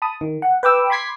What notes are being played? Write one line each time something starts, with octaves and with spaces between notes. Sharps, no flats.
A5 B5 D#6
D#3
F#5
B4 G5 D6 E6
B5 C6 D6 G#6 B6 C7